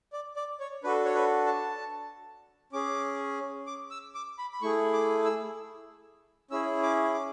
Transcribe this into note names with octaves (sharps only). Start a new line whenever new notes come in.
D5
D5
C#5
D4 F#4 A4 B4
C#5
B4
A5
C#4 G#4 D6
D6
E6
D6
B5
B5
A3 E4 G#4 C#6
D6
E6
C#4 E4 G#4 E6
D6
D6